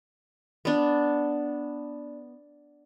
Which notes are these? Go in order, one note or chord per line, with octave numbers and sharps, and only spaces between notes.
B3 D4